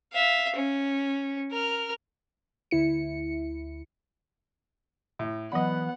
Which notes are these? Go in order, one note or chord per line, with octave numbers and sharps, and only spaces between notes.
E5 F5
C#4
A#4 F6
D2 E4 C#7
A2
E3 F#3 B3 D5 D#5 F#5 B5